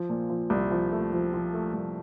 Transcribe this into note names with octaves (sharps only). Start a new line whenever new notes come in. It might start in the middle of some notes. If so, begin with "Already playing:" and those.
Already playing: F3
A#2
F3
C2
F3
A3
F3
F3
A3
C2